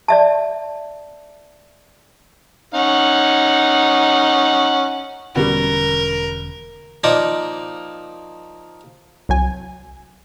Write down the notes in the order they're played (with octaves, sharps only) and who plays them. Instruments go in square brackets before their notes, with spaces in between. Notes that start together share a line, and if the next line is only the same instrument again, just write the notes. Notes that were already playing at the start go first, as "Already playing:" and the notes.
[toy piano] D5 E5 A5
[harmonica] C#4 D#4 F#5
[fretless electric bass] E1 D3 C#4 [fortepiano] B2 G3 [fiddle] A#4
[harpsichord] F3 A#3 D#4 A#4 D5
[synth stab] C2 F#3 G#5